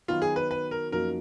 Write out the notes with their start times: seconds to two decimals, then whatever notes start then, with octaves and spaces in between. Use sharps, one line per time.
0.08 D#3 F#3 B3 D#4 F4 F#4
0.22 G#4
0.36 B4
0.51 B4
0.71 A#4
0.92 F#2 F3 A#3 D#4 F#4 A#4